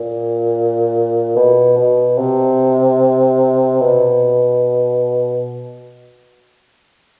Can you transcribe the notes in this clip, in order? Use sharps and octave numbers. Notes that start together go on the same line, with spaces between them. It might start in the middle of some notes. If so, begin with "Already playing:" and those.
Already playing: A#2
B2
B2
C3
B2